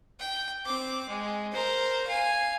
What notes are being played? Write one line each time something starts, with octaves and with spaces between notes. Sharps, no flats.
G5
C4 D6
G#3
A#4 C5
F5 G#5